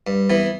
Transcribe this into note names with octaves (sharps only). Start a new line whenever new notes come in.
G2
E3 B3